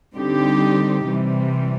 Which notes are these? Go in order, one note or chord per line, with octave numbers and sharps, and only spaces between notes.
D3 G3 C4 D#4 G4
C3 E3 G3